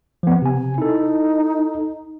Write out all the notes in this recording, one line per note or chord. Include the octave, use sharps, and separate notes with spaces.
F3 B3
C3 G#5
D#4 E4 A4